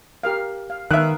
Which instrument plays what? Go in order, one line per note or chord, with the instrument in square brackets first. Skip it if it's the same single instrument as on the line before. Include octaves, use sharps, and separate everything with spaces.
[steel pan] G4 A#4 F5
F5
[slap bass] D#3 [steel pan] D#4 B4 F5 [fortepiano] E5 F#6